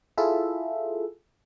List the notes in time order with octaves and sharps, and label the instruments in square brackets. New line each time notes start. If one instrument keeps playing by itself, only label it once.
[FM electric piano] E4 F4 G#4 A4 E5